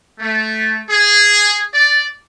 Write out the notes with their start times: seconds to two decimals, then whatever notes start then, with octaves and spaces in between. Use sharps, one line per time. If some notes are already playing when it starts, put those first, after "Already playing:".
0.19 A3
0.90 G#4
1.74 D5